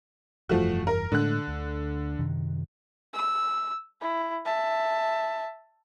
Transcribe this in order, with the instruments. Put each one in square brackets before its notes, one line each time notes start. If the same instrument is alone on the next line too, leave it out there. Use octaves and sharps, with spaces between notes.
[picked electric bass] F1 G2 E3 [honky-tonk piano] F3 A3 F#4
[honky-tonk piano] A#4
[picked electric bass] A2 G#3 A3 [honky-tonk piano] D3 F#6
[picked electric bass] D2
F#2 C3 D#3
[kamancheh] E6
E4
E5 A5